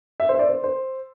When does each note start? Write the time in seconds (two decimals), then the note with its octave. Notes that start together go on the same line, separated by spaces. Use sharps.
0.20 E5
0.29 C5
0.35 E5
0.39 D5
0.49 C5
0.64 C5